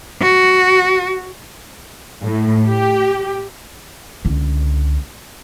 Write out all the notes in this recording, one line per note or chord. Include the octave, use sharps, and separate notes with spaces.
F#4
A2
G4
C#2 D3